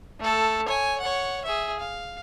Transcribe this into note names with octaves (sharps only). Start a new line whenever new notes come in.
A3 A4
C#5 G#5
C#5 F#5
G#4 E5
F5